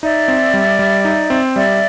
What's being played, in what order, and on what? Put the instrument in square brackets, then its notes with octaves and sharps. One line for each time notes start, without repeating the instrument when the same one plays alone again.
[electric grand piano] D#4 [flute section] D5 E5
[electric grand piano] C4
G3
G3
D#4
C4
[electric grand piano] G3 [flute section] D5 E5